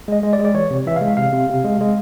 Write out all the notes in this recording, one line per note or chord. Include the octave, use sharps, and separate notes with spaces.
G#3 D#5
G#3
D5
G#3
D5
E3 C#5
C3
E3 E5
G#3 F5
C3 F5
C3
C3
G#3
G#3